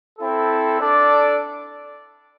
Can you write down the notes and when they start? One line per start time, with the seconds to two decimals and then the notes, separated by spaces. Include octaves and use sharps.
0.19 C4 E4 A4
0.79 D4 A4 D5